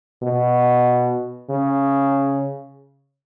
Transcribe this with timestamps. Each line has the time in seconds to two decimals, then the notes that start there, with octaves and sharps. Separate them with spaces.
0.22 B2
1.50 C#3